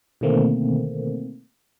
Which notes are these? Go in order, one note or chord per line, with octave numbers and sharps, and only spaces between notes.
B2 D3 D#3 A3 A#3 C4